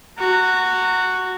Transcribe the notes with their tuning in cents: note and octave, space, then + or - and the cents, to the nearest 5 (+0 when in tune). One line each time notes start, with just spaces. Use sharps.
F#4 +0 A#5 -35